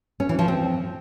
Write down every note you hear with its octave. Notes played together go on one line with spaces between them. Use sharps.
C#4
E3
F3
C4